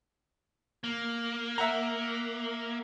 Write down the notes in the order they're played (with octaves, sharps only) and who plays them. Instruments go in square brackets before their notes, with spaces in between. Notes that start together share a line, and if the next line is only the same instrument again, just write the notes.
[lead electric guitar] A#3
[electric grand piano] E5 F#5 A#5